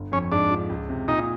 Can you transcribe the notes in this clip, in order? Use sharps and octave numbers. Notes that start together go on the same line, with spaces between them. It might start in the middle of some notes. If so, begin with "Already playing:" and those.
Already playing: G1
F2 C#4
G#2 D4
F3
C#2
C3
A#2 D#4